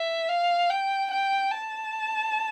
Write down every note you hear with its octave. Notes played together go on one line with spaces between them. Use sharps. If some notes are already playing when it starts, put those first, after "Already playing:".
Already playing: E5
F5
G5
G5
A5